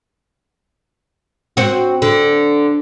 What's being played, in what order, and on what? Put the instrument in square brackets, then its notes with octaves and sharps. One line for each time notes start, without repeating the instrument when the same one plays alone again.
[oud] C4 F#4
D3